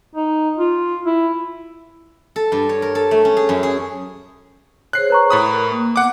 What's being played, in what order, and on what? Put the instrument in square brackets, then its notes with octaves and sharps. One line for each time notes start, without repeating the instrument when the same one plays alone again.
[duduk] D#4
F4
E4
[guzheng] A4
G2
C#5
A#4
A4
A3
C#4
G#4
F#2
G#4
[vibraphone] G#4 C5 C#5 [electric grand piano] F#6 C7
[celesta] B4 A#5 C#6
[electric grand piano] A2 B5 D#6
[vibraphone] A#4
A#3
[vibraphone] B3 [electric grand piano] F#5 D6